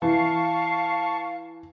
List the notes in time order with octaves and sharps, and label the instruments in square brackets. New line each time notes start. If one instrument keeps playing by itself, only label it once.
[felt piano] E3 [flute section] F5 [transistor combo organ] A5 C#6